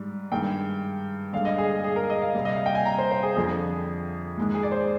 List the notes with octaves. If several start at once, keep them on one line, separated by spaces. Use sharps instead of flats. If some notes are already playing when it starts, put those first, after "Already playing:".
Already playing: G#2 G3
G2 D#3 G#3 G5
G2 D3 G#3 F5
D#5
G#4
G#4
G#4
A#4
D#5
F5
C3 G3
D#5
F5
G5
G#5
A#5
C5
C5
G#4
F2 D3 F3 G#4
G#2 D#3 G#3
G#4
D5
C5